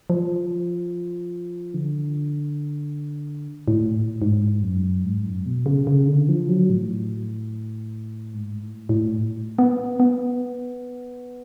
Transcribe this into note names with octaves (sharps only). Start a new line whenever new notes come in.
F3
D3
A2
G#2
F#2
G#2
F#2
B2
C#3
C#3
D3
F3
F#3
A2
G#2
A2
A2
B3
B3